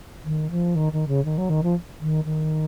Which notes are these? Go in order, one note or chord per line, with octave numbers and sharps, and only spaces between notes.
D#3
F3
D#3
D#3
C#3
D#3
F#3
D#3
F3
D#3
D#3